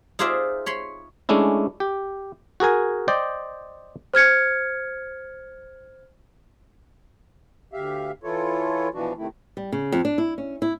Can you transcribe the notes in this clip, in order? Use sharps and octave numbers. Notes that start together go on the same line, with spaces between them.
D#4 F4 G#4 C5 D5 E5
C#5 B5 C6
G#3 A3 C#4 D4 E4
G4
F#4 G#4 A#4 G#5
C5 D5 D#5 G5
C5 F6 G#6 C#7
D2 G4 E5 F5
E3 E4 F4 A4 C#5
B2 E3 F3 D4 F#4
C3 D#3 A3 E4
G3
C#3
F2
D4
E4
C#4
E4